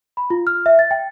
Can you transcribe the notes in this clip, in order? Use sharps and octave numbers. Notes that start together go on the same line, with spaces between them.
B5
F4
F6
E5
A6
G5